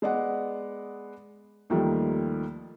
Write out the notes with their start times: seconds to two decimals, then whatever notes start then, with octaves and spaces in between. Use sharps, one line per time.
0.02 G#3 B3 D5 D#5 F#5
1.70 D#2 D#3 F3 G3 A3 A#3